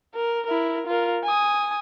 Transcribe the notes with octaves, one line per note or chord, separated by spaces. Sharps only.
A#4
E4 A#4
F4 A#4
G#5 D#6